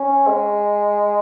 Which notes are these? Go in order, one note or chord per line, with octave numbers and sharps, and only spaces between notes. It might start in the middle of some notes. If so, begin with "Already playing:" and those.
Already playing: C#4
G#3